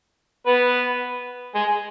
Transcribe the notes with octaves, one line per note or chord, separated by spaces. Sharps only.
B3 B4
G#3 G#4